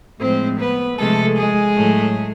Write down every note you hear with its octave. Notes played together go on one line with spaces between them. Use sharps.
A2 F3 G#3 C4 C5
B3 B4
C3 F3 G#3 A3 A4
G#3 G#4
A2 F#3 A3